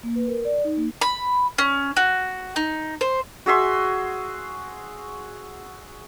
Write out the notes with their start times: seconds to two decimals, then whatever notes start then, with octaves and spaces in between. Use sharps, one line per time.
0.03 A#3
0.16 B4
0.28 A#4
0.45 D5
0.64 D#4
0.76 A#3
1.01 B5
1.58 C#4
1.97 F#4
2.56 D#4
3.01 C5
3.46 F#4 G#4 E5 C6